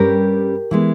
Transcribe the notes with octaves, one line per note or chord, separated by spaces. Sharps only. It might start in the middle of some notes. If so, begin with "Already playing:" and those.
Already playing: G2 G3 C#4 G4 A#4
E3 G#3 B3